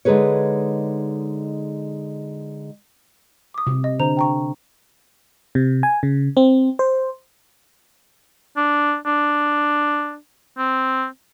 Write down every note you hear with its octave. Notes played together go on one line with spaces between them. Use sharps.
D3 G#3 D#4 G#4 B4 C#5
D6 D#6
C3
D#5
D3 C5 A#5 F7
G5 A#5 C#6
C3
G#5
C#3
C4
C5
D4
D4
C4